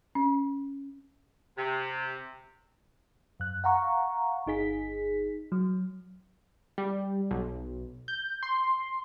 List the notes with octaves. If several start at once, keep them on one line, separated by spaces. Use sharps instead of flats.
C#4
C3
F#2 F#6
F5 F#5 A#5 C#6
G1 D#4 G#4 B6
F#3
G3
B1
G6
C6